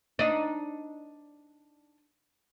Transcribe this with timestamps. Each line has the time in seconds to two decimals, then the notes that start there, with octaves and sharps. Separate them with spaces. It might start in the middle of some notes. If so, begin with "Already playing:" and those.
0.19 D4 D#4